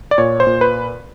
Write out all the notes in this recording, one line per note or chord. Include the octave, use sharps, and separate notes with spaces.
D5
A#2 C#5
C5
A#2
B4